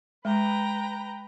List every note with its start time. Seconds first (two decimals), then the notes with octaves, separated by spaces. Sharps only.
0.25 G#3 B4 G5 A#5